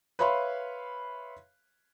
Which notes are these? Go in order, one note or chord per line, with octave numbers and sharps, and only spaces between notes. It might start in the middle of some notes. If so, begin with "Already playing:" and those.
B4 C#5 E5 F5 B5 C6